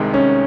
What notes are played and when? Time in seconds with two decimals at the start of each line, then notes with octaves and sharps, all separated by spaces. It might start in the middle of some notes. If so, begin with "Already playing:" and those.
Already playing: C2 C3 D#3 G#3
0.14 C#4